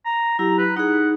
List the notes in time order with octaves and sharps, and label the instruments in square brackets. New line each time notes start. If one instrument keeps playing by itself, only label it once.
[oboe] A#5
[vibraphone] F#3 E4 G4 [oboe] A#5
[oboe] B4
[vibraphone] D#4 G#4 [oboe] F#5